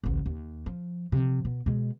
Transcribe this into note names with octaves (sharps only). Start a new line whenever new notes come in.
A1 D2
D#2
F3
C3 F3
B2
B2 G#3